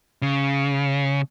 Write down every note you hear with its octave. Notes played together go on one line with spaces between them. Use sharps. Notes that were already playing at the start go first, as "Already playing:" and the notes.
C#3